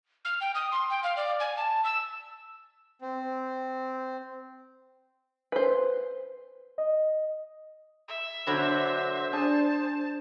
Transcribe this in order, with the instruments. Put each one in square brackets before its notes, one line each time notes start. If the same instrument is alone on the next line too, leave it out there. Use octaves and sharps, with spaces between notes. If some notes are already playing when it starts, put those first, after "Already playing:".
[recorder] F6
G5
D#6
C6
G5
F5
D5
G#5
A5
E6
[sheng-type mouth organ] C4
[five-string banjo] B4 C5
[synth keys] D#5
[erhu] E5
[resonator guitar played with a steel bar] B2 D3 F#3 [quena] C5 [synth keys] A#6
[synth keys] D4 [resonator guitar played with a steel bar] G#4 [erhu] A5